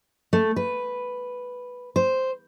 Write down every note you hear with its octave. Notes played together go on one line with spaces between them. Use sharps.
A3
B4
C5